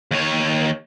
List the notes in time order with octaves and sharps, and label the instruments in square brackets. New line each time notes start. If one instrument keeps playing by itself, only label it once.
[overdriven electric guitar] D#2 C#5